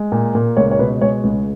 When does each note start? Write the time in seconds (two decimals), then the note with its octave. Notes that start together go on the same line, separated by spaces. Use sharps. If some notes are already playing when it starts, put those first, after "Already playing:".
Already playing: G#3
0.12 A#2
0.35 A#2
0.57 C#2 C#5
0.71 C#5
0.79 B2 B4
1.01 G#3 C#5
1.24 C#2